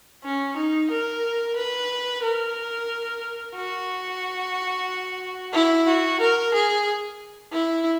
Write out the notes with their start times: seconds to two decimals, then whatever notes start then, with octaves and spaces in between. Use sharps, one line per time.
0.24 C#4
0.57 D#4
0.91 A#4
1.56 B4
2.23 A#4
3.55 F#4
5.54 E4
5.87 F#4
6.21 A#4
6.54 G#4
7.52 E4